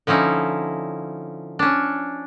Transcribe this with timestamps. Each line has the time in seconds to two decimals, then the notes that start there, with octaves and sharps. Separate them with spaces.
0.07 D3 F3 C#4 D#4 E4
1.59 C#4 D4